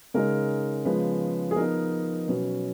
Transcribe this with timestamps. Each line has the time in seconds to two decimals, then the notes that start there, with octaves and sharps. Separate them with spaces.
0.14 C#3 G#3 D#4 A#4
0.85 C#3 F3 G#3 B3 B4
1.51 G#4
1.56 F3 B3 D#4 A#4
2.28 B2 F#3 C#4 B4